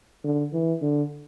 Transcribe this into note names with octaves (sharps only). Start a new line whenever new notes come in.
D3
E3
D3